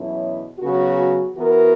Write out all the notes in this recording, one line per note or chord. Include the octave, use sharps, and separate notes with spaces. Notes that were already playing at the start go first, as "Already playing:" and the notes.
Already playing: E2 B2 F#3 C#4 E4
C#3 F#3 B3 F#4
E3 B3 F#4 A#4